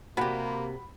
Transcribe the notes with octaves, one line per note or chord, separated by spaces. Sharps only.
A2 C3 A#3 F#4 G4 B5